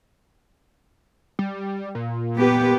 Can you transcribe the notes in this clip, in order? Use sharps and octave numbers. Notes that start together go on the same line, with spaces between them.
G3
A#2
B3 G4 B4